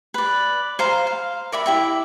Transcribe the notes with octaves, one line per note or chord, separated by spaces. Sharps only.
B4 D5
C5 F5 A#5
F5
A#4 D5 E5 B5
E4 G4 E5